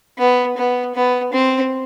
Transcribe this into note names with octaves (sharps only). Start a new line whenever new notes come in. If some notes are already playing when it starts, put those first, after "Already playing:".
B3
B3
B3
C4